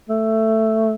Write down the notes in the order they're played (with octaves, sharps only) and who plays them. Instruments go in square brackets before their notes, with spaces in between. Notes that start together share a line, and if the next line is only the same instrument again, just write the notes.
[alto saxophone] A3